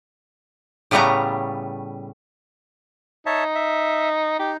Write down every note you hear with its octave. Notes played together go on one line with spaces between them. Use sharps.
A2 C#3 G3 A3 B3 A#5
D#4 C#5 E5 A5
E5
D#4 G4